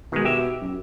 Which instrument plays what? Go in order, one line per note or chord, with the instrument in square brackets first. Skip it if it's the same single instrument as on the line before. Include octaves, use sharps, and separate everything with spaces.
[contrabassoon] B2 [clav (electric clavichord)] D#3 G#3
[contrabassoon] B2 [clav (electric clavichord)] G4 E5
[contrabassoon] F#2